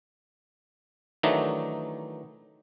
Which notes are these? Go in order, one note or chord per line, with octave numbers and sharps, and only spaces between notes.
D#3 E3 F#3 A3 D4 D#4